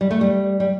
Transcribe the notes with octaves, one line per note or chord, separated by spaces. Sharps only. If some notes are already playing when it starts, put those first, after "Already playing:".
G3
A3
G3
G3